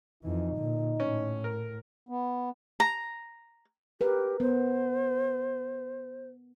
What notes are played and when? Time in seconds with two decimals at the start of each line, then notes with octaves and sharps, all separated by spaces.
0.23 F2 E3 D#4
0.55 A#2 D3
1.00 A2 C#4
1.44 A#4
2.09 B3
2.80 A#5
4.01 G4 A#4 B4
4.40 B3 C5